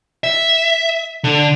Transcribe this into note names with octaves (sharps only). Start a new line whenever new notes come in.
E5
D3